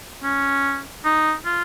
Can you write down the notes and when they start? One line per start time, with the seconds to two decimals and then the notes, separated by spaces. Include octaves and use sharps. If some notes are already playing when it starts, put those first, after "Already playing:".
0.23 C#4
1.05 D#4
1.45 F4